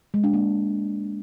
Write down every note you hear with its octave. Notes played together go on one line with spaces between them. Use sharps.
G#3
D4
A#3